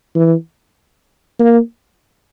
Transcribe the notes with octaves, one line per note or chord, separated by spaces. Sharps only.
E3
A#3